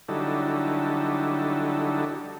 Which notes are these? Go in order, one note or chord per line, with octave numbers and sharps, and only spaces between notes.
D3 F#3 G3 D#4 E4 A4